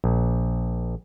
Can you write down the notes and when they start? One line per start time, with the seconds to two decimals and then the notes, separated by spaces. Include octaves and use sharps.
0.04 A#1